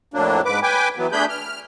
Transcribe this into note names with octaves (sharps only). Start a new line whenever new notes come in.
F2 A2 F#3 A#3 D4
G#2 B4 D6
B4 G5 G#5 D6
E3 F#3 B3
A3 D4 G#4 B5 G6
F6